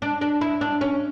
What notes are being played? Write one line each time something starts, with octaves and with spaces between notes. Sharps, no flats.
D4
D4
E4
D4
C#4